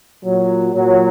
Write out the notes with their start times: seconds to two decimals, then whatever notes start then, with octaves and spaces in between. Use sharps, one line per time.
0.24 A#2 F#3
0.73 A#2 F#3